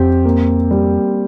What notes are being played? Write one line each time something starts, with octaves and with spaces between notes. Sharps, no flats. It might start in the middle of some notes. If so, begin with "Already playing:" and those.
Already playing: F2 C4 G4
A#3
G3